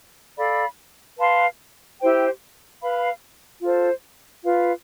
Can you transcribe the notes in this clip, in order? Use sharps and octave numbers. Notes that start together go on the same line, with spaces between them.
A4 D5 F5 B5
B4 F5 A5 C6
E4 G4 C5 G5
B4 F5 B5
F4 A4 C5
F4 B4 F5